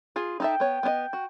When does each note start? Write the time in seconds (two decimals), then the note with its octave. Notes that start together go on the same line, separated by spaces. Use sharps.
0.16 F4 G#4
0.40 D#4 A4 E5 G5
0.60 B3 C#5
0.83 B3 D4 D#5
1.13 F#4